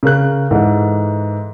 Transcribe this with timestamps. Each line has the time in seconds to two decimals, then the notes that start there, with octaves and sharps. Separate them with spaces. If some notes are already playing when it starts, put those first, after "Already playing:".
0.03 C#3 A#4 F#6
0.51 G#2 E3 A4